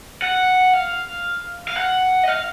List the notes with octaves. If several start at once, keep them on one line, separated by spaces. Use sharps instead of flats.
F#5
F5
F5
F#5
D#5
F5